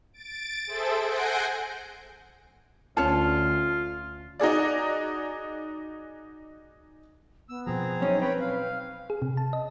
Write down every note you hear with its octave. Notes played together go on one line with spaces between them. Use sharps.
A6 D7
G#4 A4 C5 E5
F#5 G#5 G6 A#6 C7 D7
D2 C#4 F4 C#5 A5
D#4 F#4 G#4 D5
B3 E6
B2 F3 C4 G#4 A#5
F#2 C#4 D#4 C#5
C4 B4 C#5 G5 B5
F5
G#4
C3
A5
D#5